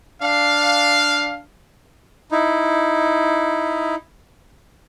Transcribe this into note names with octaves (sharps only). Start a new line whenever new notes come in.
D4 F5
D#4 E4